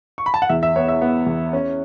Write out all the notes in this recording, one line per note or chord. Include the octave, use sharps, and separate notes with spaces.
C#6
B5
A5
F#5
E2 E5
E5
B3 C#5
E5
B3
E2
C#4